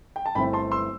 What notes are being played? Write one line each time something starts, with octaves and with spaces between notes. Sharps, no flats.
G5
A5
G1 G2 E3 A3 C4 G5 B5
A5 C6
C6 E6